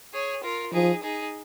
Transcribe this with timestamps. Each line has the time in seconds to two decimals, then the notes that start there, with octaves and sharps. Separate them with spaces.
0.13 G#4 C#5
0.43 F4 A#4
0.73 F3 D#4 G#4
1.02 D#4 G#4